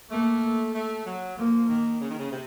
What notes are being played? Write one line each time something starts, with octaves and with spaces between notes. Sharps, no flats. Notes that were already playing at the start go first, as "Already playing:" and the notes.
A3 A#3
A3
F#3
F3 A#3
D#3
C#3
D#3
C#3
C3